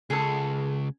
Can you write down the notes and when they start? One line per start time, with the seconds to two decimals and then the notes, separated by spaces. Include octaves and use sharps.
0.10 C#2 G#4 A4